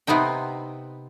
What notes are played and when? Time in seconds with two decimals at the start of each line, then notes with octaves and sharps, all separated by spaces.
0.07 C3 B3 C4 D#4 G5